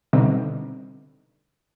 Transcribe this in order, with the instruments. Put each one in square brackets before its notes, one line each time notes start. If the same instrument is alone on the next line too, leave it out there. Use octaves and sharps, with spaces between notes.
[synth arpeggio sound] B2 D3 G3 B3 C4 D#4